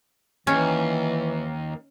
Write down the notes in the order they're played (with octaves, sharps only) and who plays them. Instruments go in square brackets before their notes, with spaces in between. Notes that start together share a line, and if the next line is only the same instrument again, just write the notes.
[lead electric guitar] D#2 [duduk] E3 [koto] C#4